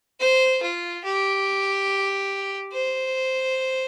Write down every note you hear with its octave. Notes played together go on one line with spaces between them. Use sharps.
C5
F4
G4
C5